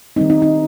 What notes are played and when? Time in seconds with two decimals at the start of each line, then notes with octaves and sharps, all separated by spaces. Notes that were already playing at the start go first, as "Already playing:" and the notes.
0.16 D#3 G3 C4 D#4
0.30 D#4
0.42 D#4